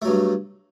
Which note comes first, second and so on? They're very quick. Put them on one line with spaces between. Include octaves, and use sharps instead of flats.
A3 F#3 G2